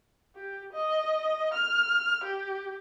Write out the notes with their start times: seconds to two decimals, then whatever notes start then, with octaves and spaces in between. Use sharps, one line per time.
0.36 G4
0.73 D#5
1.54 F6
2.24 G4